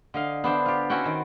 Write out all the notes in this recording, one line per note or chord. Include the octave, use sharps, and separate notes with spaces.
D3 D#5 F5
B3 D4 C5 E5
F4 G4
C4 C#4 E4 F#4 F#5 G5
D#3 C5